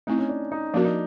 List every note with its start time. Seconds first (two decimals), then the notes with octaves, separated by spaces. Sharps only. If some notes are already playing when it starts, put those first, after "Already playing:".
0.07 A3 C4 D#4 E4
0.18 C#4
0.29 D4
0.52 D#4
0.74 F3 A#3 C#4 D4 F#4 A#4
0.85 D#4